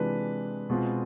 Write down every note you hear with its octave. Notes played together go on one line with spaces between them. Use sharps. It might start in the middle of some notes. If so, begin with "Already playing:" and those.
Already playing: C3 E3 G#3 D4 F4 B4
B2 G#3 C4 F4